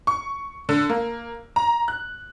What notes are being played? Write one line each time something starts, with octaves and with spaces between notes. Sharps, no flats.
C#6
D3
A#3
A#5
F#6